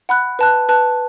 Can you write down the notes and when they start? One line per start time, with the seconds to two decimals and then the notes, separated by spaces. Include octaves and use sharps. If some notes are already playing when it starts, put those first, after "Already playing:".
0.09 F#5 B5 F#6
0.39 B4 A5 F#6
0.69 B4 A5 F#6